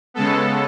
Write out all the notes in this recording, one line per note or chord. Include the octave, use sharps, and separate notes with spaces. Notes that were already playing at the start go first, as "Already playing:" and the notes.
C#3 G#3 B3 A4